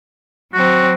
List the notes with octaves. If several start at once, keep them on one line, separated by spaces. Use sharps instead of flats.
F#3 C4 F#4